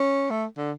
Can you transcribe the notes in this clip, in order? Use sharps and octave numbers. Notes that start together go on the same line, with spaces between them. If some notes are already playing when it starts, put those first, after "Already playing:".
Already playing: C#4
A3
D3